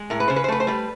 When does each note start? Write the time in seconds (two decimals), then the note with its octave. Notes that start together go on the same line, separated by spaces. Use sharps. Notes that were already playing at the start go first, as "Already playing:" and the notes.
Already playing: G#3
0.10 A2 A#4
0.20 B4
0.28 C#3 C5
0.36 B4
0.44 C5
0.48 A3 B4
0.60 C5
0.67 G3 B4